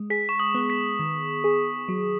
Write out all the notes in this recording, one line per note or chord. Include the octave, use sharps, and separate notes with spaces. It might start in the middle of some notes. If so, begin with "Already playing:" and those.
Already playing: G#3
G#4 B6
C#6
D#6
B3
B6
D#3
G#4
F#3